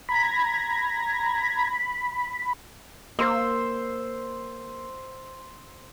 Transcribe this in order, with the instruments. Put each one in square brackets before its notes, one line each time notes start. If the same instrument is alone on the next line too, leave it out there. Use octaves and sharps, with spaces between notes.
[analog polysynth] A#5 G#6 A#6 [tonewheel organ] B5
[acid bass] A#3 [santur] C5 E6